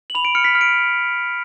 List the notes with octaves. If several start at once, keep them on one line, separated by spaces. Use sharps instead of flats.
F#7
B5 F7
D7
F6 C#7
B6
F6
D7